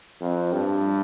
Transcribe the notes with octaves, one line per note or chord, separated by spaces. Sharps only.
F2
G2